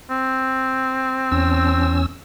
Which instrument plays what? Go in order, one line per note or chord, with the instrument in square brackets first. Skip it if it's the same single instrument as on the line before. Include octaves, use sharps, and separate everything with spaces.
[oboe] C4
[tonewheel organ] E2 C#4 E6